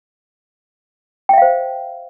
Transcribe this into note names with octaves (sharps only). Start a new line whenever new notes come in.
C5 E5 F5 G5